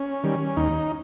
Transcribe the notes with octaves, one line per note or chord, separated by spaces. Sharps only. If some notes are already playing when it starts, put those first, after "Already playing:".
Already playing: C#4
D#3 G3
D#2 D#4